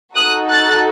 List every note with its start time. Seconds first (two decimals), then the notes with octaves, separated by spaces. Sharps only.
0.15 D#4 F#4 A4 D#6 F#6
0.50 F#6 A6